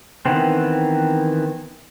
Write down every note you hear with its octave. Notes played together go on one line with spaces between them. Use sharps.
D#3 E3 B3 C4